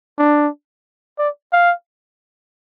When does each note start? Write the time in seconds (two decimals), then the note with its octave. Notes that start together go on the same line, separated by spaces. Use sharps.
0.18 D4
1.19 D5
1.53 F5